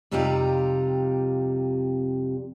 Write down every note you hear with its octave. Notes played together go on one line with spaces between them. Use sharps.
F2 C3 G3 D#4 F4 G4